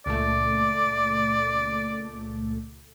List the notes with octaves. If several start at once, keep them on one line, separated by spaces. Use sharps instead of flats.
C#2 A#2 A3 D5